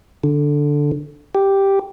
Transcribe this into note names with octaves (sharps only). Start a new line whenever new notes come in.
D3
G4